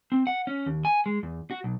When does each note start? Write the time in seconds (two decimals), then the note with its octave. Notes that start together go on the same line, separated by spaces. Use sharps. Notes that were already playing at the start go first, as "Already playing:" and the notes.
0.12 C4
0.27 F#5
0.47 C#4
0.66 D#2
0.85 G#5
1.06 G#3
1.23 E2
1.51 F#4
1.64 B1